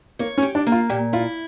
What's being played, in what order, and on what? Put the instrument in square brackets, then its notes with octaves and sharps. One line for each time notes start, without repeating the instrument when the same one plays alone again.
[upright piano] A#3 [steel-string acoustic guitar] C#5
[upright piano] C#4
[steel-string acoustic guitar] G4
[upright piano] D4
[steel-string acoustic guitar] A#3
[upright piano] F4
[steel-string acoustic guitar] A#2 [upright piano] G4
[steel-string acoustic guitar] E4 [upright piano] F4